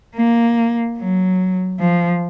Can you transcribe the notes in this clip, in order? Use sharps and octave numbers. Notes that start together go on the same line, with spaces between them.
A#3
F#3
F3